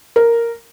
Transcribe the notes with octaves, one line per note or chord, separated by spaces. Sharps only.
A#4